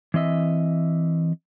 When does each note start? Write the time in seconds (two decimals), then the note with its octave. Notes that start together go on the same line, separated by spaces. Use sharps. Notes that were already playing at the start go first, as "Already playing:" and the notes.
0.14 E3 C4 D#5 E5